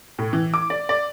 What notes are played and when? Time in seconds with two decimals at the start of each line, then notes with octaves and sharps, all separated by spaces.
0.19 A2
0.33 E3
0.54 D6
0.70 D5
0.89 D5